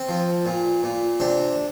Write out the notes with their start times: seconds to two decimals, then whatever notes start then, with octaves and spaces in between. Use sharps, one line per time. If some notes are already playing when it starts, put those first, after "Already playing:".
Already playing: C4
0.09 F3
0.46 A#2
0.83 A#2
1.20 C3 D4